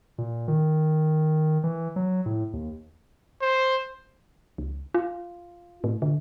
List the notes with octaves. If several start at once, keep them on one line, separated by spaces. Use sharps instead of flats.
A#2
D#3
E3
F#3
A2
D#2
C5
C#2
F4
A2
D3